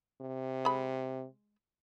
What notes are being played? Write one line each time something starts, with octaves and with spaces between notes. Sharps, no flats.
C3
G#3 B5